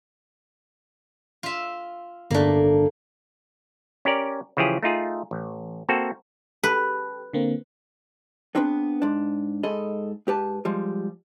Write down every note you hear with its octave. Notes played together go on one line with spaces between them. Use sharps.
F4 E5
G1 A3 A#3 D4
C#4 G4 A#4 D5
C#3 E3 F3 G4 G#4
A3 D#4 F4 G#4
A1
A#3 C4 F#4 A4
G4 A4 B4
D3 A#3 C4
B3 C4 D4 G#4 B4
G#2 D4
G#2 G#4 A4 D#5 B5
G#2 G4 B4 A5
F3 G3 G#3